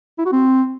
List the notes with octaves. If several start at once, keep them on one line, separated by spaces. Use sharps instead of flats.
E4
F#4
C4